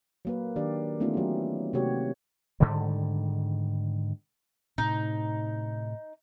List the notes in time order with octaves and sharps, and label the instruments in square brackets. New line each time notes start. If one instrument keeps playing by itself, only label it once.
[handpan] F#3 A#3 B4
D#3 D4 G4 D5 F5
E3 A3 B3 C#4 D#4 F4
F#3 G4
C3 A3 A#3 F#4 G4 C#5
[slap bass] G#2 D3 D#3 G3
[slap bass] A2 C3 [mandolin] D#4